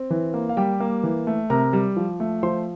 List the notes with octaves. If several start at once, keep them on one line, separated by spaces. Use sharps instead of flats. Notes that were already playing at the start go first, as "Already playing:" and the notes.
Already playing: C4
E3
A#3
F5
G3 G4 G5
A#3
E3
A3
C3 A#4 A#5
G3
F3
A3
F3 C5 C6